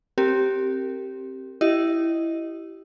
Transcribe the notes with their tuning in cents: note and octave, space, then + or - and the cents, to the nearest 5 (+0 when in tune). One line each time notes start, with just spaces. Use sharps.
C4 +15 G4 -10 A#4 -25
E4 +5 G4 -25 D#5 +0